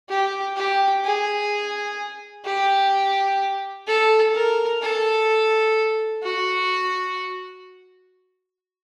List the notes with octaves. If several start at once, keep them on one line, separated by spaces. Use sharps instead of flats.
G4
G4
G#4
G4
A4
A#4
A4
F#4